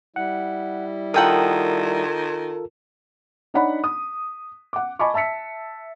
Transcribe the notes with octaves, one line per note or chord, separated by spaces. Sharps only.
G3 E4 F#5
D#3 F4 A4 A#4 F#5 G5 D#6
D4 D#4 C#5 D5 F#5 B5
D#6
F#5 D6
D#5 G#5 A5 B5 C#6 D6
E5 A5 E6 B6 C#7